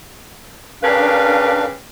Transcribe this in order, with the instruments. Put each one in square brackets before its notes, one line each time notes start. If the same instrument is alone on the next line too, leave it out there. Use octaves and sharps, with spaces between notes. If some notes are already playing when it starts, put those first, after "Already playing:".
[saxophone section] C#3 G4 B4 [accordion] D4 A#4 F5